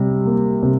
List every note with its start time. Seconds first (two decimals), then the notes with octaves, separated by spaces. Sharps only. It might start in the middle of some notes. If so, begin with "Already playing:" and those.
Already playing: C3 G3
0.26 A#3
0.63 C3